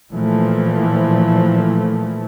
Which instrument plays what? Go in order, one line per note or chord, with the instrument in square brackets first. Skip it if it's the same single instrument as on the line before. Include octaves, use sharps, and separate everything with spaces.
[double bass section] A#2 E3 F3 A3